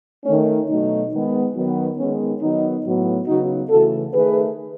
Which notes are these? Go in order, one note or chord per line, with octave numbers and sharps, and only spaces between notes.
D#3 A3 C#4
B2 F#3 A3 D#4
D#3 G#3 B3
D#3 F#3 B3
D#3 G#3 B3 C#4
D#3 F#3 B3 D#4
A2 F#3 B3
C#3 F#3 B3 D#4 F#4
C#3 E3 A3 F#4 A4
D#3 A3 G#4 B4